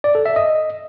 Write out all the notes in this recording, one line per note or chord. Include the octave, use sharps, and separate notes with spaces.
D5
A4
E5
D#5